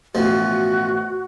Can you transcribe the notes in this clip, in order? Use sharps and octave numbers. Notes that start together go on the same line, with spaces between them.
A1 B2 F3 F#4